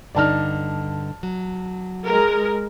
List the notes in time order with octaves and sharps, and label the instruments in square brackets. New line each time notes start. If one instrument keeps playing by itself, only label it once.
[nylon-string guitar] G2 D3 D#4 [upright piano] D5 A5 F6
[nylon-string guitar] F#3
[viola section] G#3 A#4